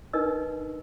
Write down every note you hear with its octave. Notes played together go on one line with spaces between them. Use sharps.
D4 D#4 A#4 B4 D#5 E6